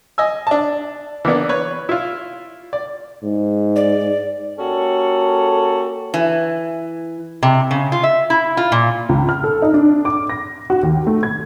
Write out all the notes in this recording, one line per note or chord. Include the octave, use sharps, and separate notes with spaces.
D#5 G#5 E6
D4 A5
E3 A#3 B3 D4
B4 C#5
E4 F4
D5
G#2
D5
A#3 C#4 F#4 G4 A4
E3
C3
C#3
F4
E5
E4
F4
A#2
C#2
F6
A4
D#4
D4
D6
A#6
F#4
D#2
A3
G#6